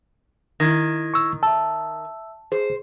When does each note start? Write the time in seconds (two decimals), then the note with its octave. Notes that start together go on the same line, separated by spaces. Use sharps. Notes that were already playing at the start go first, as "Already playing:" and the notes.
0.60 D#3 E4 G#6 A#6
1.14 C#6 E6
1.43 E5 A5 E6
2.52 G#4 C5